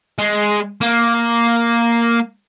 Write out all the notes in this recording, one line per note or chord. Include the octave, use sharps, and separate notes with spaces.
G#3
A#3